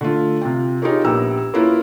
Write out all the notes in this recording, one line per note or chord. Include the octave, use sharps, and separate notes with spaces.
D3 A3 F4
C3 F4 G5
D#4 F4 G4 G#4 A#4 C#5
A#1 B3 G4 G5 A#5 E6
A#3 C#4 E4 F4 A#4 B4